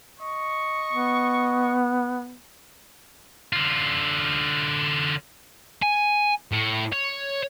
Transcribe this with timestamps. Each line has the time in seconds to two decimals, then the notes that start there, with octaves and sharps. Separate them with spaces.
0.20 D#5 C#6
0.93 B3
3.53 D3 F4
5.83 G#5
6.52 A2
6.92 C#5